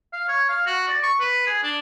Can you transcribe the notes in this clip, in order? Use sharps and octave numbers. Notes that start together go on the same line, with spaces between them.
F5
C#5
F5
F#4
D5
C#6
B4
G#4
D4